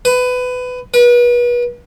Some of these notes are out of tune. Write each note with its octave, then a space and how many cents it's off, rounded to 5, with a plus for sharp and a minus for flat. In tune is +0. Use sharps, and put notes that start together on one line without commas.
B4 +20
B4 -35